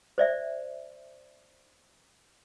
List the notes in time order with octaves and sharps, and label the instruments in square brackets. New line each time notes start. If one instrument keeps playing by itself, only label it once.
[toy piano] C5 D5 E5